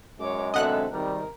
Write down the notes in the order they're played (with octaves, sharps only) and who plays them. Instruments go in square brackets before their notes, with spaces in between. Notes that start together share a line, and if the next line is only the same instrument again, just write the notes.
[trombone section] F#2 G#3 [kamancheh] C#5 D6
[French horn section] B2 D3 C4 [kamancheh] A4 E5 [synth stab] D#5 F#5 F#6
[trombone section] G#1 G3 [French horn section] C3 D#3 [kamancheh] A#4